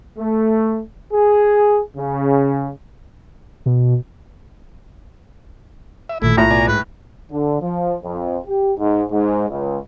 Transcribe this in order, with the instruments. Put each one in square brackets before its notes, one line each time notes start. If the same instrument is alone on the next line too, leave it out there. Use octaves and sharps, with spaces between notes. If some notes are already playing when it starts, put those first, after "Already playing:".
[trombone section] A3
G#4
C#3
[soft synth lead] B2
[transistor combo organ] E5
[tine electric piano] A1 A#2 D#3 [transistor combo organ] A3 [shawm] E4
[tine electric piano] B1 F4 [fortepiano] A2 [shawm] A#5
[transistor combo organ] B2 D5 G#5
[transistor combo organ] G#2 [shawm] B4
[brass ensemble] D3
F3
F2
G4
G#2
G#2
C#2